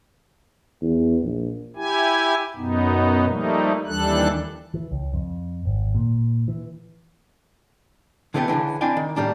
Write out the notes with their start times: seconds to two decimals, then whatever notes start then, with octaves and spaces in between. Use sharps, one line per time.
0.82 E2
1.22 A#1
1.76 E4 G4 G#5
2.56 F#2 B2 B3 D#4
3.27 F3 G3 A3 A#3 D#4
3.87 D#2 E3 G3 D4 A4 F#6
4.74 E3
4.91 C#2
5.14 F2
5.65 G#1
5.95 A#2
6.48 E3
8.34 D3 E3 A3 B3 F4 G4
8.48 C#2 F#2 D3 E3
8.81 C4 D4 E4 F5 G5 G#5
8.97 D#3
9.16 A2 G3 A#3 D4